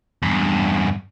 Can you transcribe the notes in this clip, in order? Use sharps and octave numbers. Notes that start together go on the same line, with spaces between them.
E2 G2